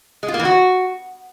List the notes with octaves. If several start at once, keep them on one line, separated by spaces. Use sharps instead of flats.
G#3
F4
A#3
E3
F#4